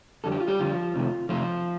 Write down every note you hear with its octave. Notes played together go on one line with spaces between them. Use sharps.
F2 D3 G3 A4
G4
F4
G3 G4
F2 D3 F3 G3 F4
F2 C3 D#3 A3
F2 C3 D#3 F3 A3 F4